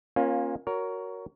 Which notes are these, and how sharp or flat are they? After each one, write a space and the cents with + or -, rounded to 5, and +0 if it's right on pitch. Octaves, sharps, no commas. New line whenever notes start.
A#3 +20 C#4 -25 F4 +10
F#4 +0 A#4 +0 C#5 +20